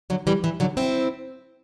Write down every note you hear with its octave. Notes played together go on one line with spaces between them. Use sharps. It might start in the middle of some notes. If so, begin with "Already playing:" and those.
D3 F#3
E3 G3
E3
D3 F#3
C4 E4